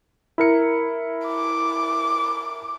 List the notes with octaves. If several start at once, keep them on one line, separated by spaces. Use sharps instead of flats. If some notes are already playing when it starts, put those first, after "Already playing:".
E4 A#4 C#7
D6